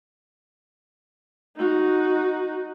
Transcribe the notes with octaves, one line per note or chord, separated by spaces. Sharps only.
D#4 F#4